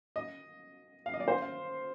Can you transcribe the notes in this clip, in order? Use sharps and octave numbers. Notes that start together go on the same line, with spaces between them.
D#5
F5
D#5
D5
C5
F5